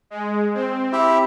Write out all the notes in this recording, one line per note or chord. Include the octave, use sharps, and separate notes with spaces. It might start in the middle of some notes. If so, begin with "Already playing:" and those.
G#3
C4
E4 G4 E5